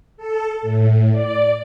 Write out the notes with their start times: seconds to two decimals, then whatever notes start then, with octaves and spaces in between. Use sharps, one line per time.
0.17 A4
0.62 A2
1.12 D5